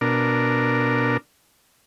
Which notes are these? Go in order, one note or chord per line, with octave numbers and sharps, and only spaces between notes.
B2 D4 A#4